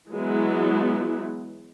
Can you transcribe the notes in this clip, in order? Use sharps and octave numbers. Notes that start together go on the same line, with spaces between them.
E3 F#3 G#3 B3 E4